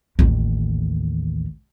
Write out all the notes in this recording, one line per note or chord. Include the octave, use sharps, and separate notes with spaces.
A1 D#2